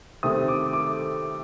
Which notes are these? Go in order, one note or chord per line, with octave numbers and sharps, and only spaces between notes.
C3 D#3 A3 C4 D#6
D6
D6